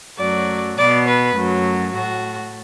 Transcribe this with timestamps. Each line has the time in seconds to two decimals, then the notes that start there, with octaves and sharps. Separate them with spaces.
0.19 F#2 F#3 A3 D5
0.78 B2 B3 D5
1.08 B4
1.37 F#2 F#3 A3
1.95 A2 A3 F#4